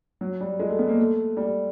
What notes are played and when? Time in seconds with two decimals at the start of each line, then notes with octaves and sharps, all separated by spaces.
0.21 F#3
0.41 G3
0.60 G#3
0.69 A3
0.79 B3
0.88 A#3
0.98 A3
1.37 G3